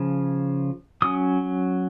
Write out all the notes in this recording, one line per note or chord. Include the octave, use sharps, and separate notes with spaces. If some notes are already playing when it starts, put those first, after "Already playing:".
Already playing: C#3 F3
F#3 C#4 D#6